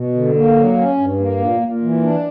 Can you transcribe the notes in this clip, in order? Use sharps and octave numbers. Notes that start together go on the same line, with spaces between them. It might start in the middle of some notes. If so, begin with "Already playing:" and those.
Already playing: B2
D3
A#3
F#3
C#4
G2
A#3
A#2
A#2
E3
D4